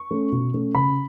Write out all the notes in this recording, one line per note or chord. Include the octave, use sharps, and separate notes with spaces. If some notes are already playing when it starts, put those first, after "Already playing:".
Already playing: C#6
A3 C#4
B2
A3 C#4
C#3 B5